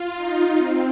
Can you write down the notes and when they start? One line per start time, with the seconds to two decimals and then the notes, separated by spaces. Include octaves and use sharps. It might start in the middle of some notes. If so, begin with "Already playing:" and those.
Already playing: F4
0.14 D#4
0.57 C4